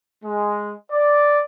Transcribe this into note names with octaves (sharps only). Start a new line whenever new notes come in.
G#3
D5